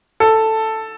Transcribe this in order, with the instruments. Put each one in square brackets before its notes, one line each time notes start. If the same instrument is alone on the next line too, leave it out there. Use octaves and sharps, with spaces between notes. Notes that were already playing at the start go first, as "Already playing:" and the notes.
[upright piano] A4